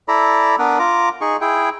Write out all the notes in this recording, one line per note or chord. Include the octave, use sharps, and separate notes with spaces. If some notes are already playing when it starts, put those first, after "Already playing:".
E4 A4 D5 A#5 B5
B3 D4 A#4 B4
F4 A#5 D6
D#4 G#4 C#6
E4 G#4 G5